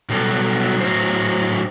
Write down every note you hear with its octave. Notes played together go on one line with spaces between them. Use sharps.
B2 F#3 G3 F#4 A4
A2 F#3 C5